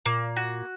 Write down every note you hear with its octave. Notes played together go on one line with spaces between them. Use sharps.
A#2 A#3
F#4